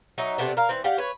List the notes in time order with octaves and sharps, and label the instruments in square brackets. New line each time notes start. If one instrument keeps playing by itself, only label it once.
[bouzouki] F#3 D#4 E5
C3 A3 B3 D4
A#4 F5
E3 C4
G4 D5 F5 F#5
B4 C#5